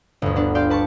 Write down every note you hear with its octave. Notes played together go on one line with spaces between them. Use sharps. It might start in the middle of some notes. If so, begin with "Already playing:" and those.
G1 D2
B3 D4
F4 G4 D5 G5 C6
B4 A5 C#6